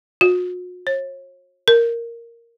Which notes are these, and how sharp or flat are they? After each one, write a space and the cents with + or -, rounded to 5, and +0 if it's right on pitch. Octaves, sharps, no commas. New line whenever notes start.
F#4 -45
C#5 -40
A#4 +0